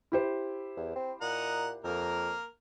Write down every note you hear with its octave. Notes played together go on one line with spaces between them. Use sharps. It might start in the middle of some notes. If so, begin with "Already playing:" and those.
E4 G4 C5
E2
C4
A#2 D#4 F#5 A#5
F2 A#3 A#4